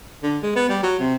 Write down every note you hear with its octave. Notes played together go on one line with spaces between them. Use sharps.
D3
G#3
B3
G3
F#3
C3